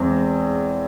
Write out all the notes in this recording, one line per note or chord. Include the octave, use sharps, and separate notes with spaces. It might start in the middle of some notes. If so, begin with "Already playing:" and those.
Already playing: E2 G#3 C4